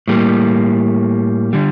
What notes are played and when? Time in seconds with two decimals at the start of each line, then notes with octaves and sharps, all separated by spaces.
0.08 A2 G3 A#3
1.53 D3 G3